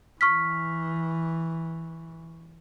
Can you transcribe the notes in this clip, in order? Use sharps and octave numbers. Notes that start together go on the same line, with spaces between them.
E3 C#6 F6 B6